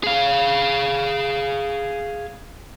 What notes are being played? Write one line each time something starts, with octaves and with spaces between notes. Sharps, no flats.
G#4 F5